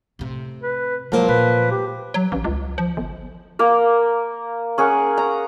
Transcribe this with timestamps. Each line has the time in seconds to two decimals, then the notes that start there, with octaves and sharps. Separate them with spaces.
0.19 A2 C3
0.62 B4
1.12 F3 F#3 G#3 A#3 C5
1.28 A#2 B4
1.71 G4
2.14 F#3
2.32 A1
2.44 C#2
2.78 F3
2.97 G1
3.59 A#3 A#4
4.78 C#4 G#4 A#4 F#5
5.18 A#5